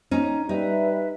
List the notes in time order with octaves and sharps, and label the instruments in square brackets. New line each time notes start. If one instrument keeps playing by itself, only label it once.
[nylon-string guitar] C#4 D#4
[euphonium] G3 [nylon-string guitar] D#4 [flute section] B4 E5